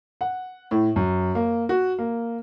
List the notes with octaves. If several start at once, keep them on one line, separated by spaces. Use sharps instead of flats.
F#5
A2
F#2
A#3
F#4
A#3